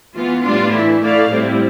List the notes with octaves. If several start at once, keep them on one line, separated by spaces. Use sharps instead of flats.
E3 B3 F4
A2 G3 B3 D4 F4
E3 A3 E4
A3 E4 A4 D5 F5
A2 G3 C4 E4